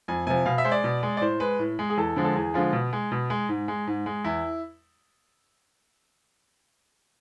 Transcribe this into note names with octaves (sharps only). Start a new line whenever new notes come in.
F2 G#5
C3 F3 G#5
B2 F5
E5
G#3 C5
D5
B2
G#3
D5
A2 C5
G#3 B4
A2
G#3
G#4
E2 A4
D3 F3 G#3
A4
E2 G#4
D3 F3 G#3 F4
B2
G#3
B2
G#3
G#2
G#3
G#2
G#3
E2 E4